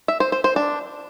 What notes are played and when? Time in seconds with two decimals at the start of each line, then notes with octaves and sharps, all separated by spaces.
0.08 E5
0.20 C5
0.32 C5
0.44 C5
0.56 D4